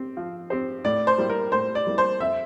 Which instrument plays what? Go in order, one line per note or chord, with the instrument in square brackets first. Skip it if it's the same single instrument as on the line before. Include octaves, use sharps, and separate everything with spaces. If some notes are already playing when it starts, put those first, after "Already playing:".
Already playing: [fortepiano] C4 G4 C5
F3
C4 G4 C5
[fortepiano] A2 [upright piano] D5
[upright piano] C5
[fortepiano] G3 A#3 E4
[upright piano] A#4
[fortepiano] A2 [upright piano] C5
[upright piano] D5
[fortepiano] G3 A#3 E4
[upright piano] C5
[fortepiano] F2 [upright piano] E5